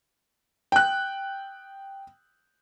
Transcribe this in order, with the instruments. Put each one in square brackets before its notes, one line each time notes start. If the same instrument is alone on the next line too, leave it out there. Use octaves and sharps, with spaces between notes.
[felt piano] G5 F#6